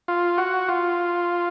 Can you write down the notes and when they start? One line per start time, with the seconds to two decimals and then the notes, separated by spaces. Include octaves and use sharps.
0.08 F4
0.38 F#4
0.68 F4